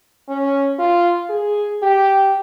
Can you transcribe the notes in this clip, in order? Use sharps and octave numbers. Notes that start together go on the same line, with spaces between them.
C#4
F4
G#4
G4